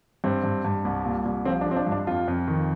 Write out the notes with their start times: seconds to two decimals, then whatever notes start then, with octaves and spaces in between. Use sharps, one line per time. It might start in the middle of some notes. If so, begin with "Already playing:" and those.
0.24 G2 C4
0.44 G2
0.65 G2
0.85 C2
1.05 A#2
1.26 C2
1.45 F3 C4
1.61 D4
1.66 F3 C4
1.77 D4
1.87 G2
1.92 D4
2.07 F2 F4
2.28 F2
2.48 D#3